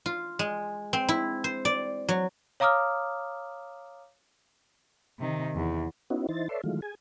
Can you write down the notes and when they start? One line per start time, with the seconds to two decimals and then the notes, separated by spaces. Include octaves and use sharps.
0.06 F4
0.39 G#3
0.93 C4
1.09 E4
1.44 C5
1.65 D5
2.09 F#3
2.60 C#5 F5 A#5 D6 D#6 F6
5.19 C3 D#3
5.56 E2
6.10 B3 C#4 D#4 E4 F#4
6.29 E3 D#4 E4 C5 A6
6.49 A4 B4 C#5 D5 E5 C6
6.64 D#3 E3 F#3 G#3 A3 F4
6.82 G#4 G#5